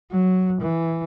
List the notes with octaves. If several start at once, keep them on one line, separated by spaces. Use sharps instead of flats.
F#3
E3